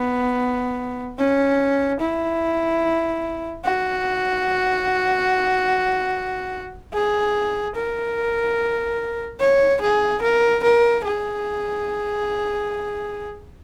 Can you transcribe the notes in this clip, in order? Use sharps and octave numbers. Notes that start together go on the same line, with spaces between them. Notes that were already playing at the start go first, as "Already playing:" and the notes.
Already playing: B3
C#4
E4
F#4
G#4
A#4
C#5
G#4
A#4
A#4
G#4